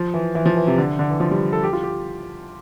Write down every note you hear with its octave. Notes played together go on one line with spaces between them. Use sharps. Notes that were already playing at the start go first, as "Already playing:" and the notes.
Already playing: F3
E3
E3
F3
E3
C3
D3
D3
E3
F3
G3
A4
G4
F4
G4